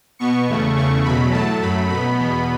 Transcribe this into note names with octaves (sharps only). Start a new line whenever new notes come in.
B2 B3 C#6
E2 C#3 A3
E2 C#3 A3 C#6
E2 B2 F#3 B5
A2 F#3 A3 A5
F#2 F#3 A3 B5
B2 B3 B5
E2 B2 B3